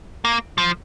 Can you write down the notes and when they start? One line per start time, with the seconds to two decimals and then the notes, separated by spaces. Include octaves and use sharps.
0.25 A#3
0.58 F3